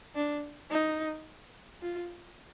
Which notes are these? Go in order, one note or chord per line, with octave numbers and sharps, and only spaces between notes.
D4
D#4
F4